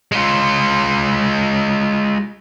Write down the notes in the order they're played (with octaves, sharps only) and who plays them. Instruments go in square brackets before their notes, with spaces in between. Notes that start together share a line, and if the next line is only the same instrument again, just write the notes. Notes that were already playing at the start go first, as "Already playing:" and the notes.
[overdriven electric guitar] G#3 F4